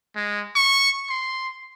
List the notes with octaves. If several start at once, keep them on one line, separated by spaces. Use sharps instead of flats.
G#3
C#6
C6